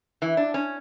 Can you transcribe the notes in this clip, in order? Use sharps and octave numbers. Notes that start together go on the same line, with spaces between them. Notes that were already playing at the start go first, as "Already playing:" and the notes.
E3
D4
C#4